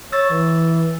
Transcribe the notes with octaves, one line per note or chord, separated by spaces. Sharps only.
C#5 E6 A6
E3